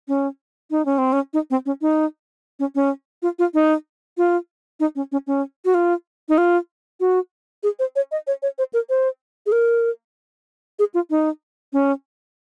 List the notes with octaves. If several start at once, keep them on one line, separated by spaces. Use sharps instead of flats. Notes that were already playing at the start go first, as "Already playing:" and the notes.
C#4
D#4
C#4
C4
C#4
D#4
C4
C#4
D#4
C#4
C#4
F4
F4
D#4
F4
D#4
C#4
C#4
C#4
F#4
F4
D#4
F4
F#4
G#4
C5
C#5
D#5
C#5
C#5
C5
A#4
C5
G#4
A#4
G#4
F4
D#4
C#4